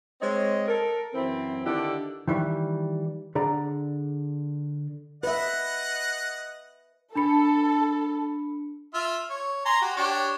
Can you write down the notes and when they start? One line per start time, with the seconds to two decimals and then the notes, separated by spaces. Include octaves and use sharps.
0.22 G#3 C4 C#5 D#5
0.68 A4 A#4
1.14 F#2 E3 C4
1.66 D3 D#3 D4 E4 G4
2.28 D#3 E3 G3
3.35 D3 G#4 D5 A#5
5.23 B4 D#5 E5 F#5
7.15 D4 A4 B5 C#7
8.94 F4 E5
9.30 C#5
9.65 G#5 A#5 C6
9.81 F#4 G4
9.96 D4 G4 C#5